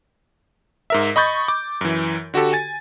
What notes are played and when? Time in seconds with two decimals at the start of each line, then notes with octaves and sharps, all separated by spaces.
0.90 G#2 A#4 E5
1.16 D#5 B5 C#6 G6 A6
1.48 D6
1.81 F#2 E3
2.34 D3 F#4 G4 A4
2.53 G#5 A6